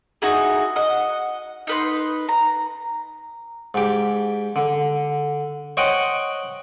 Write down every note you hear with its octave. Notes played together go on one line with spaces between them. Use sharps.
D#4 E4 F#4 G#4
D#5 F#5
D#4 B4 C6
A#5
G#2 G4
D3
C5 C#5 D#5 F#5 G5